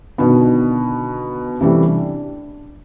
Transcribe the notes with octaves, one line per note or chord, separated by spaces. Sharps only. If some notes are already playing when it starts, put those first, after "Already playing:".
B2 D3 D#3 B3
C3 E3 G3 A3
D4